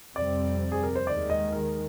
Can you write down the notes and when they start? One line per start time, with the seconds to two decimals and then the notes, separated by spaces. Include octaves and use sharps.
0.16 F2 C3 G3 C4 D5
0.72 G#4
0.83 A#4
0.95 C5
1.07 D#2 D#3 G#3 D5
1.30 D#5
1.52 A#4